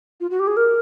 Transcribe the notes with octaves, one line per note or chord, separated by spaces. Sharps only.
F4
F#4
G4
G#4
A#4